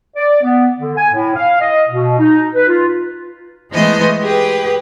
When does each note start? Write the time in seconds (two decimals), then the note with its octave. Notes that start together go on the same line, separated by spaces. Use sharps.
0.16 D5
0.43 B3
0.79 D3
0.97 G#5
1.13 A2
1.36 F5
1.61 D#5
1.89 B2
2.19 D#4
2.55 B4
2.68 F4
3.71 E3 G#3 A3 B3 C5 D#5
4.21 G4 G#4 B4 G5